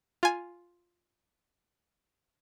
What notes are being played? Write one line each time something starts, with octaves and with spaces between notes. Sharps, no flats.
F4 G#5